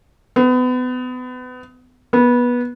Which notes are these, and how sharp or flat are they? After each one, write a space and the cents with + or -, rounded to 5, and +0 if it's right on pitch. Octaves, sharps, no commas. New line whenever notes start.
B3 +30
B3 -20